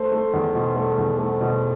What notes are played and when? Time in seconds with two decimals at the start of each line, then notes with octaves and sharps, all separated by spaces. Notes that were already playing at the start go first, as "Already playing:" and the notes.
Already playing: A3 C5
0.12 A3
0.33 E2
0.55 B2
0.76 A3
0.98 E2
1.19 A3
1.41 B2